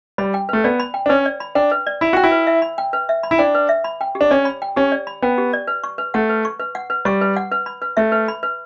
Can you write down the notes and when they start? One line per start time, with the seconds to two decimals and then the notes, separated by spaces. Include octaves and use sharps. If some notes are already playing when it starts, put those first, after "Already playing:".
0.18 G3 B5
0.34 G5
0.49 A3 B4
0.64 B3 D5
0.80 B5
0.94 G5
1.06 D4
1.09 C#4 B4
1.26 D5
1.40 B5
1.55 D4 G5
1.71 B4
1.87 D5
2.01 E4 B5
2.13 F#4 G5
2.23 E4
2.32 B4
2.47 E5
2.62 B5
2.78 G5
2.93 B4
3.09 E5
3.23 B5
3.31 E4
3.38 D4 G5
3.55 B4
3.69 E5
3.84 B5
4.01 G5
4.15 G4
4.21 D4
4.30 C#4 D5
4.45 B5
4.62 G5
4.76 C#4 G4
4.92 D5
5.07 B5
5.22 B3 G5
5.38 G4
5.53 D5
5.67 B4
5.84 C#6
5.98 B4
6.14 A3 F#5
6.29 B4
6.45 C#6
6.59 B4
6.75 F#5
6.90 B4
7.05 G3 C#6
7.21 B4
7.36 F#5
7.52 B4
7.66 B5
7.82 B4
7.97 A3 E5
8.12 B4
8.28 B5
8.43 B4